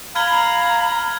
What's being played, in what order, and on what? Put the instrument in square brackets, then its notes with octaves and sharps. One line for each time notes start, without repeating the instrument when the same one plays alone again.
[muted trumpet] F5 [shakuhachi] A#5 [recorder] B5 [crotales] F6 G#6 G7